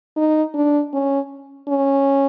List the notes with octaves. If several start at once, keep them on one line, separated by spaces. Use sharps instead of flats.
D#4
D4
C#4
C#4